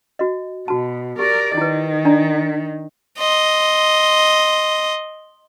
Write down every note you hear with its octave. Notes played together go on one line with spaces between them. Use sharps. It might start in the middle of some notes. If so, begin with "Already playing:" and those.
F#4 D#5
B2 F#4 A5
G4 A#4 D5
D#3 E4 B4
D4 D5 A#5
D#5 C6